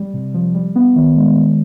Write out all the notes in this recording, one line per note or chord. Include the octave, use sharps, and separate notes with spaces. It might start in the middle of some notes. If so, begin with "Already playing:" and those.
Already playing: G3
C3
F3
G3
B3
D#3
G#3
D#3